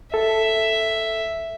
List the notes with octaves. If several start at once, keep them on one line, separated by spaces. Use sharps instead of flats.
A4 E5